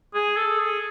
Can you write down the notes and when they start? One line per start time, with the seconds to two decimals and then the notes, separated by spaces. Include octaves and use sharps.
0.14 G#4
0.37 A4
0.60 G#4